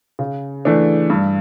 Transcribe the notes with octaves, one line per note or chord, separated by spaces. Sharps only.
C#3
E3 A3 D4
G2